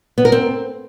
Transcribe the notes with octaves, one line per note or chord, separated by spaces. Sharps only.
B3
A#4
C4